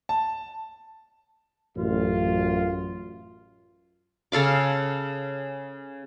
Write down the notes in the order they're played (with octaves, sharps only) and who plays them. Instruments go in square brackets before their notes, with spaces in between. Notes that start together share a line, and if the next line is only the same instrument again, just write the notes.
[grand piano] A5
[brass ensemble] A1 F#2 F4
[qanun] C#3 A4 F5 D6